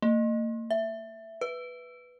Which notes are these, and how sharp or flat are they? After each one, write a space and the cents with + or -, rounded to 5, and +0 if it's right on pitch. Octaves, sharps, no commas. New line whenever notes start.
A#3 -40
E5 +5
B4 +0